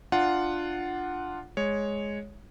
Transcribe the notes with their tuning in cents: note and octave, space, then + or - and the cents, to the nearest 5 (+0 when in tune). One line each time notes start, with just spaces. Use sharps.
D4 +20 F4 +0 F#5 +0
G#3 +0 C#5 +0